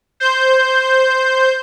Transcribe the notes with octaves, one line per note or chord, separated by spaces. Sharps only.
C5 G6